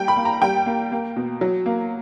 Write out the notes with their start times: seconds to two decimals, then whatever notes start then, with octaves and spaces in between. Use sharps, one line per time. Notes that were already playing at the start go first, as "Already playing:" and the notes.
Already playing: G3 A#3 G5
0.08 B5
0.16 A#3
0.25 A#5
0.42 G3 G5
0.66 A#3
0.92 A#3
1.16 B2
1.41 F#3
1.66 A#3